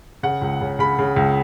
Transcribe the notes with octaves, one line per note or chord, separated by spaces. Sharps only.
C#3 F#5
C#2
C#3
C#3 B5
C#3
C#2